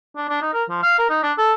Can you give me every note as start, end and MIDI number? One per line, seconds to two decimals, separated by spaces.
0.16 0.27 62
0.29 0.42 62
0.42 0.52 63
0.54 0.64 70
0.69 0.80 53
0.83 0.98 77
0.99 1.08 70
1.10 1.19 63
1.23 1.33 62
1.38 1.53 69